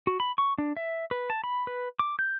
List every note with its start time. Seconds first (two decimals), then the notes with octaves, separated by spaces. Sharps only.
0.07 F#4
0.20 B5
0.38 C#6
0.58 D4
0.77 E5
1.11 B4
1.30 A5
1.44 B5
1.67 B4
1.99 D6
2.19 G6